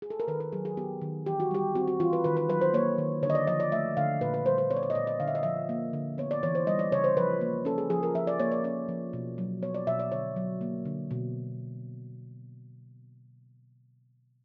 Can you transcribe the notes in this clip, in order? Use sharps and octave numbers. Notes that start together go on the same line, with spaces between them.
G#4
A4
A#4
D#3 B4
A#4
F#3 G#4
G#4
B3 G4
D#3
E3 G4
F#4
G3 G4
C4 F#4
F#4
E3 F4
B4
D#3 B4
B4
F#3 B4
C5
A#3 C#5
D#3
D3 C#5
D#5
D5
F3 D#5
D5
A3 E5
D3 F5
A#2 B4
B4
G3 C5
C5
B3 C#5
D5
C#5
D#5
A#2 D5
D#5
D3 F5
E5
D#5
F3 E5
A#3
D3
B3 C#5
D5
E3 C#5
C5
G3 D#5
D5
C#3 C#5
C5
F3 B4
A#3
C#4 A4
G#4
F3 G#4
A#4
F3 E5
D5
A#3 C#5
D5
C#4 D5
F3
B2
F#3
B3 C#5
D5
B2 E5
D5
D3 C#5
F#3
A#3
D3
B2